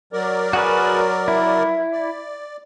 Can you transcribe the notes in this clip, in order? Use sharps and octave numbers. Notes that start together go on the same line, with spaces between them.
F#3 A#4 D5
F#4 G#4 B4
E4
D5